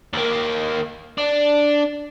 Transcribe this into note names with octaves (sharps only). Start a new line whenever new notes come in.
D#2 A#3
D4